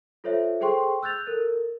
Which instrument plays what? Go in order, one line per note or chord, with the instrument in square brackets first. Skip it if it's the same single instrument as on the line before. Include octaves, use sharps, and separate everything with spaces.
[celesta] F4 A4 C5 C#5 E5
G#4 A4 C5 G5 C6 C#6
E6 F#6 G6 A6 F7
A4 A#4